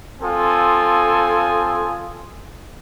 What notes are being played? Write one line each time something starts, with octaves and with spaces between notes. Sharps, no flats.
C4 F4 A4 G#5 D#6